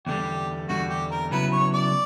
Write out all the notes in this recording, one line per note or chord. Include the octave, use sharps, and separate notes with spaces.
E2 D3 G3 G4
E2 D3 G3 F#4
G4
A#4
C#3 F#3 B3 E4 B4
C#5
D5